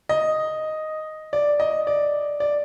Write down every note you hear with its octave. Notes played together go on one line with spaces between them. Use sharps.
D#5
D5
D#5
D5
D5